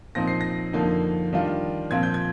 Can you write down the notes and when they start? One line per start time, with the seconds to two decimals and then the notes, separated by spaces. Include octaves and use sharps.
0.15 A#2 F3 C4 D#4 A#6
0.28 C7
0.41 A#6
0.73 F2 D3 F3 A#3 D#4
1.33 D#3 G3 D4 F4
1.91 A#2 F3 C4 F4 G#6
2.03 G6
2.14 G#6